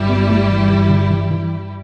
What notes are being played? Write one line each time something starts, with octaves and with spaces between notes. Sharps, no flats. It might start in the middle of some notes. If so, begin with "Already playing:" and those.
Already playing: G1 G2 G3 E4 G4
B3
A3
E3
E3
D3
E3
E3